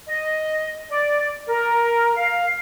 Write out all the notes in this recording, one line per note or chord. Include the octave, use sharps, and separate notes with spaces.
D#5
D5
A#4
F5